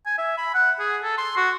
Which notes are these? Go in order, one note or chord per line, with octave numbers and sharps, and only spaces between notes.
G#5
E5
B5
F#5
G#4
A4
C6
F#4